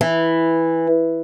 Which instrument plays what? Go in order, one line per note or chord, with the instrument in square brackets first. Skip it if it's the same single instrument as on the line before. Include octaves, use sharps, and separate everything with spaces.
[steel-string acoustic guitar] E3